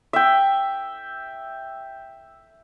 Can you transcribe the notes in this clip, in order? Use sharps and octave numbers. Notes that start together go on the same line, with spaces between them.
E5 G5